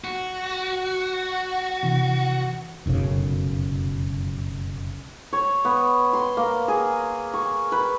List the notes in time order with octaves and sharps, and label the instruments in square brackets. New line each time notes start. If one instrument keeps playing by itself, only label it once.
[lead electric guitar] F#4
[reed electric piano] C3 E3
[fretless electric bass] F1 B1 F#2 C#3
[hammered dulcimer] C#5
B3
C6
A#3
G#4
C#6
B4